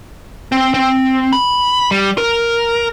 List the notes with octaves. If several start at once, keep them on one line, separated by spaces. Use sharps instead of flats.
C4
C4
B5
G3
A#4